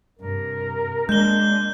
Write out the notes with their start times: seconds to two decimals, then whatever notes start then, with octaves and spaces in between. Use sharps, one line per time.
0.19 G2 C3 A#4
1.09 G#3 A#3 D4 G6 G7